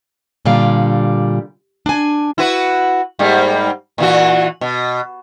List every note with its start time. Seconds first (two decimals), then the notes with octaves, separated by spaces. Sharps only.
0.45 A#2 D3 G3 F5
1.86 D4 G#5
2.38 E4 F#4 B4
3.19 G#2 G3 A#3
3.98 A#2 E3 F#4
4.61 B2